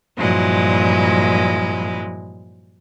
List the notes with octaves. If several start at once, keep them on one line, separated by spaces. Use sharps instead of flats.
G2 A#2 F3 F#3 G#3 E4